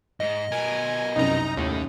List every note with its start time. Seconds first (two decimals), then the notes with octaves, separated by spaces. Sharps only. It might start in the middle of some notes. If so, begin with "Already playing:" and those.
0.20 G#2 D#5
0.52 B2 A#4 G#5
1.16 C2 F#2 D#4 A#5
1.57 D#2 A2 D#3